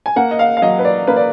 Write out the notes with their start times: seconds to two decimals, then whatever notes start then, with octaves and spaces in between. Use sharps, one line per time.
0.06 G#5
0.16 A#3 F#5
0.31 D#5
0.39 F5
0.57 F5
0.62 F#3 D#5
0.79 B4
0.85 D5
1.07 A#3 B4
1.16 D5